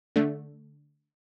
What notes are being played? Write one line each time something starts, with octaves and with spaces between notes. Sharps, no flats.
D3 A3